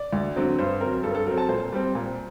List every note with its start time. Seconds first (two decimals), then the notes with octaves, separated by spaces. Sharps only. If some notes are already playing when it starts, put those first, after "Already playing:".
Already playing: D5
0.13 D2
0.36 D3 F#3 C4
0.59 G2 C5
0.81 F#3 C4 A#4
1.03 G2 A4
1.11 A#4
1.15 A4
1.26 F#3 A#4
1.31 C4
1.38 A5
1.48 A#2 C5
1.72 G3 C4
1.95 A#2